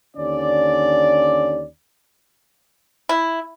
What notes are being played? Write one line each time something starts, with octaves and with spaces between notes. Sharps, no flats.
D#2 D3 C#4 D5
E4